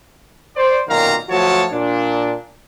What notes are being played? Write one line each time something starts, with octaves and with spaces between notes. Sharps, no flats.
C5 D5
B1 F#2 A#2 D#3 F5 A#5
F3 F#3 A3 F#4 C#5 A5
A#2 D4